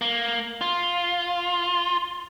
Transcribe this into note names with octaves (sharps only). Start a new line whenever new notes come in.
A#3
F4